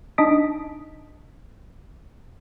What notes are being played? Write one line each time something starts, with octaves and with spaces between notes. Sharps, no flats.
D4 D#4 D#5 D#6 B6 D7